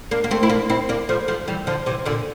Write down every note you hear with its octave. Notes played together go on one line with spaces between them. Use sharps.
A#3 D4
A#3
A3 C4
E4
A#3 D4
C4 E4
A#3 D4
F3 A3
F3 A3
E3 G3
D3 F3
C3 E3
A#2 D3